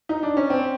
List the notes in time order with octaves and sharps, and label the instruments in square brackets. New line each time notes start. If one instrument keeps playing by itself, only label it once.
[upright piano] D#4
D4
C#4
C4